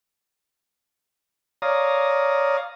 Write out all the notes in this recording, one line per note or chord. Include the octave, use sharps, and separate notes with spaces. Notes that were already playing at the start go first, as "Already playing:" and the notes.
C#5 D5 F5 A#5 D#6